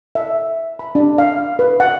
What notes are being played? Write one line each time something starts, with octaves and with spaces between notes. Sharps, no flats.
E5
B5
D4
F5
B4
F#5